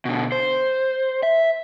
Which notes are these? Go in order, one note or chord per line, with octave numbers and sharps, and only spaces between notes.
B2 D3
C5
E5